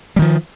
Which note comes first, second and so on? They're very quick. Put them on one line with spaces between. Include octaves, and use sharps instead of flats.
G3 D#3 F3